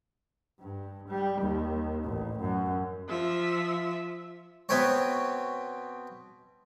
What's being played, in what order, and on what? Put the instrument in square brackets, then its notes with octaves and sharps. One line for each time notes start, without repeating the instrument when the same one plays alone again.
[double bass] G2
G3
D#2
A1
F#2
[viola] F3 E5
[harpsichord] B2 B3 C4 C#5